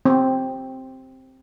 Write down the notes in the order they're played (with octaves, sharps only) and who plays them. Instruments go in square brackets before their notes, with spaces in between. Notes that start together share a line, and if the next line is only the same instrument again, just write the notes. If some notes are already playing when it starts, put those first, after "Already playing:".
[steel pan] C4